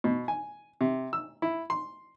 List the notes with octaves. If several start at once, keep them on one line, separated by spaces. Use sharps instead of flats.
B2
G#5
C3
E6
E4
C6